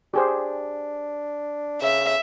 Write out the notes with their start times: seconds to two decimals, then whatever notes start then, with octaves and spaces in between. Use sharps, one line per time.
0.14 D4 G4 G#4 C5
1.82 C#3 E5